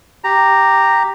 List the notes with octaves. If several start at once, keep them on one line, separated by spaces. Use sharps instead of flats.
G4 A#5